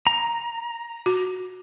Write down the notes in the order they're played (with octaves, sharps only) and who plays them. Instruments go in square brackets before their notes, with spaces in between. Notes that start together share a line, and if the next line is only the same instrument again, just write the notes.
[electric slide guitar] A#5
[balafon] F#4